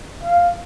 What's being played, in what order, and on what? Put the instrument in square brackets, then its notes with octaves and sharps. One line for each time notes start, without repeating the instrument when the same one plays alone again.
[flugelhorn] F5